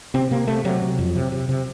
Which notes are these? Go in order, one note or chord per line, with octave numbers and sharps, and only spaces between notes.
C3 C4
C3 A#3
C3 A3
C3 F#3
C3
F2
C3
C3
C3